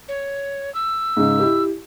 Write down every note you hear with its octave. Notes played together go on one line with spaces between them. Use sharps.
C#5
E6
G#2 C#3
E4 G4